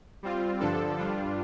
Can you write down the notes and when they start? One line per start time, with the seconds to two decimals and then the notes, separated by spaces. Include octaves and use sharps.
0.23 G3 C4 F4
0.60 G2 D3 F3 D4 A4
0.98 G2 G3 D4 F4